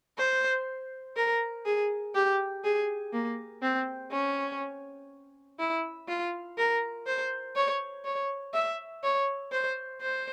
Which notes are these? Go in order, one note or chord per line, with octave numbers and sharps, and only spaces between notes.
C5
A#4
G#4
G4
G#4
A#3
C4
C#4
E4
F4
A#4
C5
C#5
C#5
E5
C#5
C5
C5